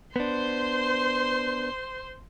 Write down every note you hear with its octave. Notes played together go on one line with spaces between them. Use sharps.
B3 D4 C5 C6